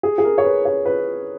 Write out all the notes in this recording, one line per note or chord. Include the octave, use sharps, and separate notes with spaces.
G#4
G#4
A#4
C#5
B4
C#5
B4